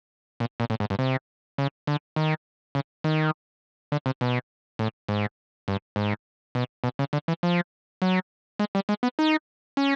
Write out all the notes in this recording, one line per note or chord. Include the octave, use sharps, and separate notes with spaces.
A#2
A#2
A2
G#2
G2
C3
C#3
D3
D#3
C#3
D#3
D3
C3
B2
A2
G#2
G2
G#2
B2
B2
C#3
D3
E3
F3
F#3
G#3
G3
G#3
B3
D#4
C#4